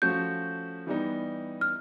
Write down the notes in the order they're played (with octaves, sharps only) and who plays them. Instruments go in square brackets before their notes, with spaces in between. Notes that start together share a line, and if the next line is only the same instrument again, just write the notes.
[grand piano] F3 A3 C#4 F#4 [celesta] G6
[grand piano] E3 G3 B3 D#4
[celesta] F6